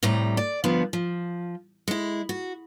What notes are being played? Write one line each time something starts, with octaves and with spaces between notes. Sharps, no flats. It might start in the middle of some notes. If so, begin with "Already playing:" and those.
A2 C3 G3 A#5
D5
G2 D3 F3 B3
F3
G#3 E4
F#4